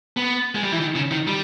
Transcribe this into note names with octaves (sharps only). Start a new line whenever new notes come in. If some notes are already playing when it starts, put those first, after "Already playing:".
B3
G#3
G3
E3
D#3
C#3
D#3
G3